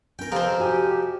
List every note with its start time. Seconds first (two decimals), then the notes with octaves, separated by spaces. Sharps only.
0.19 C#4 A#4 G5
0.32 F2 C3 F3 A#4 C5
0.60 F#4 G4 G#5